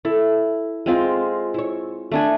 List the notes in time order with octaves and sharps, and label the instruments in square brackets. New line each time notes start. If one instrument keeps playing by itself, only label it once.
[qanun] E4 [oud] A4
[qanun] G#3 C4 F4
[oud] E4 C#5
[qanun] A3 D4 G#5